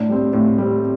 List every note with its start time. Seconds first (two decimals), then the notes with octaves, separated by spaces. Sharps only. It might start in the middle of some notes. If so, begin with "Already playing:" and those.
Already playing: A2 D4
0.09 G3 C4
0.33 A2
0.58 G3 C4